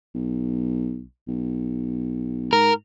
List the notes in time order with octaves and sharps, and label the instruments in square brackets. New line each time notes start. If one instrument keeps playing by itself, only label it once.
[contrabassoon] B1
B1
[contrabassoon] G#2 [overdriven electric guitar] A#4